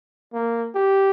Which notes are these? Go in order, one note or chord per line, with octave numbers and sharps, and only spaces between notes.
A#3
G4